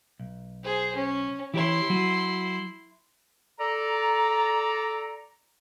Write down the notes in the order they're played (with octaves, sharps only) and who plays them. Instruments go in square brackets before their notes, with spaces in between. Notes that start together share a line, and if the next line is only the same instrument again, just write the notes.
[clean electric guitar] B1
[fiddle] G#4 C5
C#4
[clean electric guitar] E3 G4 C#5 [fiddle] E4 C6
[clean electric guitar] F#3 F#4
[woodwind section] A4 D5 A#5